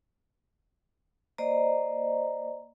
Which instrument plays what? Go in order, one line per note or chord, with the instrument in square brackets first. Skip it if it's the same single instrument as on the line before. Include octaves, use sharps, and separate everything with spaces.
[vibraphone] A#3 C5 D5 D#5 A#5